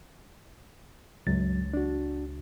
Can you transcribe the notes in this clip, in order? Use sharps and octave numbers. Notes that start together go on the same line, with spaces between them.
C#2 G2 F#3 A6
D4 F#4